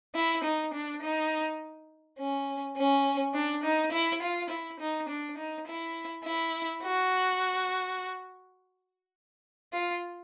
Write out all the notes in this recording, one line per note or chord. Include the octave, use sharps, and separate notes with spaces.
E4
D#4
D4
D#4
C#4
C#4
D4
D#4
E4
F4
E4
D#4
D4
D#4
E4
E4
F#4
F4